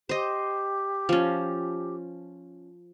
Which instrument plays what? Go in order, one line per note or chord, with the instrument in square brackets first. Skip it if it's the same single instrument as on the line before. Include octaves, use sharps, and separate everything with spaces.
[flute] G4 [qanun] C5 D#5
[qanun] F3 C#4